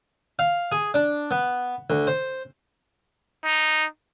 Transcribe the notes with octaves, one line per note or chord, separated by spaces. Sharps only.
F5
G#4
D4
B3
D2
C5
D#4